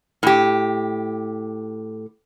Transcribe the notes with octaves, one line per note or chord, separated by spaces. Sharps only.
A2 G4